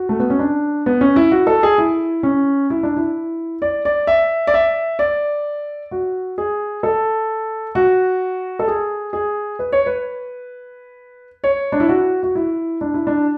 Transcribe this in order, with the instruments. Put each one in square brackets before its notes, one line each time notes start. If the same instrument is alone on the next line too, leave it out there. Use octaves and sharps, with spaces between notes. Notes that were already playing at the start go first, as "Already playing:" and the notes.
Already playing: [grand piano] F#4
A3
B3
C#4
D4
B3
C#4
E4
F#4
A4
G#4
E4
C#4
E4
D4
E4
D5
D5
E5
D5
E5
D5
F#4
G#4
A4
F#4
A4
G#4
G#4
B4
C#5
B4
C#5
D4
E4
F#4
F#4
E4
D4
E4
D4